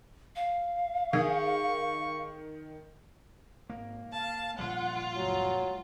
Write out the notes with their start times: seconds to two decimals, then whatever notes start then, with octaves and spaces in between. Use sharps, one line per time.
0.36 F5
1.13 D#3 G#4 C#6
3.69 G#1 A#3
4.12 F5 A5
4.59 A#2 F3 G3 F4 F#5
5.16 C#2 F#2 F#3